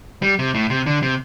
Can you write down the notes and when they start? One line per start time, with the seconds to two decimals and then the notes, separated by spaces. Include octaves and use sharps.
0.22 G3
0.39 C3
0.54 A2
0.70 C3
0.86 D3
1.03 C3